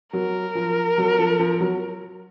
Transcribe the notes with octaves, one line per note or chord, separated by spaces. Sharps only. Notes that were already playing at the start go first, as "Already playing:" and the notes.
F#3 A#4
F3
F#3
F3
F3
F#3